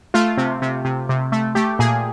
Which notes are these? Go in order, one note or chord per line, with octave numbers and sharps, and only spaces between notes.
A3 F4
C3
C3
C3
C3
A3
A3 G4
A#2 G#4